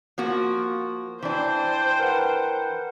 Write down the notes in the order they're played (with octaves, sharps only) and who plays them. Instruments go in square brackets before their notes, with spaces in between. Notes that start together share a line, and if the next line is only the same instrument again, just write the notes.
[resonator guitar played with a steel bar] F3 A#3 F#4
[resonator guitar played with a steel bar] E3 D4 [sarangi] C5 [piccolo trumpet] G5
[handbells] A#4 B4 F#5